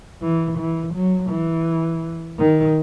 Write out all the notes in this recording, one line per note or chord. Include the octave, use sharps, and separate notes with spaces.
E3
E3
F#3
E3
D#3